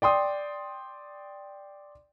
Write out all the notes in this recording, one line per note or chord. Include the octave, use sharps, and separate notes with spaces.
D5 G5 C6 D#6